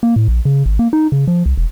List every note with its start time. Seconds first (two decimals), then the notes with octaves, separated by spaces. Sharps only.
0.03 A#3
0.16 A2
0.28 A#1
0.45 C#3
0.66 G#1
0.79 A#3
0.93 D#4
1.12 C#3
1.27 F3
1.46 C2
1.57 E1